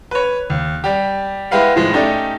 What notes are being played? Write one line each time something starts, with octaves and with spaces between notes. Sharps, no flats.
B4 C#5
D#2
G3 G4
G#3 E4 G4 B4 F5 F#5
A2 D#3 F3 G#3
A3 C#4 D#4 G4 D5